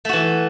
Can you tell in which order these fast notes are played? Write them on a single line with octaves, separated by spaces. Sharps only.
A3 F#4 E3